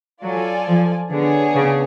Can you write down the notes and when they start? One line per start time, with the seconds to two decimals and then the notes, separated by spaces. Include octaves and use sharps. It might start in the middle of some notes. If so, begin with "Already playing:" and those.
0.23 F#3 F4 A4 D5 G#5
0.67 F3
1.11 D3 B3 D4 G#4 C#5
1.55 C#3